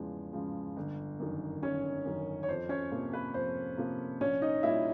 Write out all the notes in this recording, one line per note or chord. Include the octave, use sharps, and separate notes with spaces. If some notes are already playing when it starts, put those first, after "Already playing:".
Already playing: E2 C#3 F3 G#3
C#3 F3 G#3
G1
F#2 D#3
G1 C#4 C#5
F#2 D#3
C#5
F2 C5
C#4 C#5
C3 F3 A#3
B4
F2 C5
C3 F3 A#3
A#1 C#4 C#5
D#4 D#5
A#2 G3 A#3 E4 E5